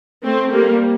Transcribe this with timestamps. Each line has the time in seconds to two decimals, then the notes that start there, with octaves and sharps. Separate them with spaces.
0.24 A3 C4
0.52 G3 A#3